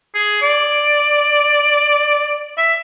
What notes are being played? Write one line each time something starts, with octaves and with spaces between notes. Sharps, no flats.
G#4
D5
E5